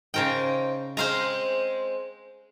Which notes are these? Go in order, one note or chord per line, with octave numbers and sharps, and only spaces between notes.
C#3 D#4 A#4 C5 G5
G#3 C4 C5 F5 A#5